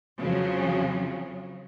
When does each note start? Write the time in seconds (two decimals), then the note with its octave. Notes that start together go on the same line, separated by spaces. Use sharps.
0.19 F2 C#3 F3 F#3